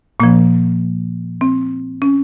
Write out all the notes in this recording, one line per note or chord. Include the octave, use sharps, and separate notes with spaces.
A#2 F3 A#3
C4
C#4